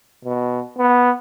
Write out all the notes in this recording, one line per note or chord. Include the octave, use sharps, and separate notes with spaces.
B2
B3